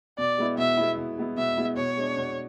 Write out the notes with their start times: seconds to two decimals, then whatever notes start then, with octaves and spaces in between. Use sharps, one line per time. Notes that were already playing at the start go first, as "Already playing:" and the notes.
0.18 B2 D5
0.38 G#3 B3 E4
0.58 B2 E5
0.77 G#3 B3 E4
0.97 B2
1.18 G#3 B3 E4
1.37 B2 E5
1.57 G#3 B3 E4
1.77 B2 C#5
1.97 G#3 D4
2.17 B2